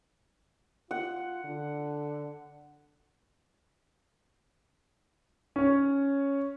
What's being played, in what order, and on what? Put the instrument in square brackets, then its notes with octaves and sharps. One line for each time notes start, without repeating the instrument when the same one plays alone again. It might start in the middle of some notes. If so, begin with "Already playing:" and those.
[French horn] F4 [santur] F#5
[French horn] D3
[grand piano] C#4 C#5